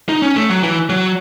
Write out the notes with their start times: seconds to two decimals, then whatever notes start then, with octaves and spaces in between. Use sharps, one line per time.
0.09 D#4
0.22 C#4
0.36 A3
0.49 F#3
0.63 E3
0.90 F#3